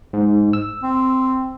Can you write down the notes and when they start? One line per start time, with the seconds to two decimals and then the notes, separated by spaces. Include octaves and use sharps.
0.13 G#2
0.53 E6
0.83 C4